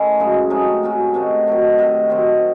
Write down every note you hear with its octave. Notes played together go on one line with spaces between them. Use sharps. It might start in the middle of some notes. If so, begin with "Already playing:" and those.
Already playing: D#3 A3 C#4 E4
F#2 C#3 G#3
C3 F#3 A3 D#4
C3 F#3 C#4 F#4
C3 D#3 A3
D#3 F#3 A3
C3 D#3 A3
D#3 F#3 C4